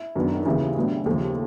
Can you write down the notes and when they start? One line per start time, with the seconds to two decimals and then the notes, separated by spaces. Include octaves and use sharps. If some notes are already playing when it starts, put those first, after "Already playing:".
Already playing: E4
0.15 F#2 D#3 F#3 B3 D4
0.35 D#4
0.46 D#2 C#3 E3 E4
0.76 A2 F#3 B3 D4
1.06 D#2 C#3 F3 A4